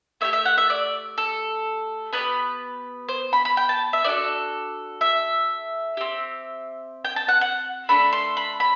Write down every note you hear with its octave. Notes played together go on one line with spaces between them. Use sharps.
A3 E4 G4 E5
E5
F#5
E5
D5
A4
B3 D4 G4 B4
C5
B5
B5
G5
A5
E5
D4 F#4 A4 D5
E5
C4 G4
G5
A5
F#5
F#5
A3 D4 A4 B5
C6
B5
B5